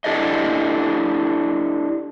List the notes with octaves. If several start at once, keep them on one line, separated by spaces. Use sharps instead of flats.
D4 E4 G4 A4 D5 D#5